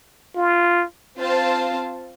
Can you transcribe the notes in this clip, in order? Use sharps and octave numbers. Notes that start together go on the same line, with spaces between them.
F4
C4 F4 C5 F5 A5